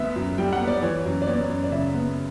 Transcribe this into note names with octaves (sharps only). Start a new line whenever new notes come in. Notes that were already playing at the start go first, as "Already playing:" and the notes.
Already playing: D2 B3 E5
F#2
G3 G5
F#5
B3
D5
E3 C#5
F#2
D5
B3 C#5
F#2
D5
C#3 E5
B3